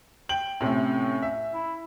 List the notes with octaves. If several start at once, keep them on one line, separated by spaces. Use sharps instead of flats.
G5 F#7
A2 C3 C#4
E5
E4